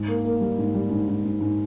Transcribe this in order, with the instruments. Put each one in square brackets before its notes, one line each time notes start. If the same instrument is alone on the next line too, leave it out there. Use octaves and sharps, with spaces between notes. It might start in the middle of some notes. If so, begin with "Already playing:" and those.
Already playing: [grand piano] G#2
A#3
A#3
G3
G#2
G3
G#2
G#2
G#2
G#2